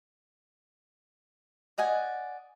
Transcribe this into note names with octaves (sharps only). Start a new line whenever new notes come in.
D5 D#5 F#5 G#5